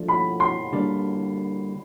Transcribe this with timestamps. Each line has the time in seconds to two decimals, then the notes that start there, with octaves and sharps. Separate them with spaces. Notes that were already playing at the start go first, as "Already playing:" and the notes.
Already playing: F3 A3 D4
0.08 B5
0.40 C6
0.73 D3 G3 A#3 D4